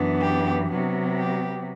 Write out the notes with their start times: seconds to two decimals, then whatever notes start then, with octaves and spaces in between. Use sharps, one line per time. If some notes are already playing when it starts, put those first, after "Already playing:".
Already playing: F#2 E3 B3 D4
0.22 G4
0.70 C3 F#3 B3
1.18 G4